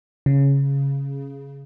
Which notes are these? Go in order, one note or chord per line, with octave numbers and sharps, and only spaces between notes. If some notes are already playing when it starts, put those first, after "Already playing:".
C#3